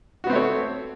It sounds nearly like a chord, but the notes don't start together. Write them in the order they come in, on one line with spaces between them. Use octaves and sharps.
F#4 B3 C4 A3 C#5